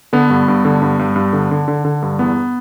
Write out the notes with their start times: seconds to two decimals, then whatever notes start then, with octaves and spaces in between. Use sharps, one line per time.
0.13 D3 B3
0.30 G2
0.48 G2
0.65 D3
0.82 G2
0.99 G2
1.16 G2
1.33 D3
1.51 D3
1.68 D3
1.85 D3
2.02 G2
2.19 E2 B3